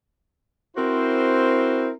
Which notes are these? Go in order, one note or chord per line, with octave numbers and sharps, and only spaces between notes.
C4 E4 F#4 A#4 C5